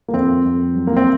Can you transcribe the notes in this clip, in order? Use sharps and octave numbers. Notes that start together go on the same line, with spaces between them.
A#3
F2 C4
F2
F#3
A#3
C4